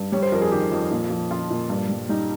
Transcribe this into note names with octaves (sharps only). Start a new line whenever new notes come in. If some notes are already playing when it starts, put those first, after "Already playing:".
Already playing: G2
G3 C#5
C5
F2 A#4
G#4
D#3 G4
F2
A#2
F3
F3 F4
A#2
G2
G3
G3 D#4